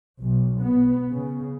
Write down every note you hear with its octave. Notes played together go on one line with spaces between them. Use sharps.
B1
B3
C#3